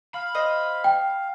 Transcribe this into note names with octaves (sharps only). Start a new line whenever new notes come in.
F5 B5
C5 D#5
G5